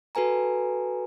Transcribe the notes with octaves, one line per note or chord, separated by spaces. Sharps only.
F#4 A4 B4 G#5 A#5